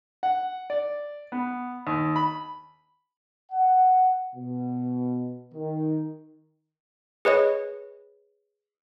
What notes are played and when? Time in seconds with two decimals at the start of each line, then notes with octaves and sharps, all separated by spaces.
0.23 F#5
0.70 D5
1.32 B3
1.87 D#2
2.16 B5
3.52 F#5
4.35 B2
5.54 D#3
7.25 G#4 B4 C#5 D#5